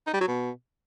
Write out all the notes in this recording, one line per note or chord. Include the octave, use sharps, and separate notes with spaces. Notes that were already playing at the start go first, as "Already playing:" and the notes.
D#4
G3
F#3
B2